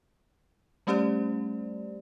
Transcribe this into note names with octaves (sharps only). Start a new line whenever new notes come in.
G3 A3 C#4 G4 C5 D5